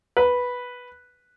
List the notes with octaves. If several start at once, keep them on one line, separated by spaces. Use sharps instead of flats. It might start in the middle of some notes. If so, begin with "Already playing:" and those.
B4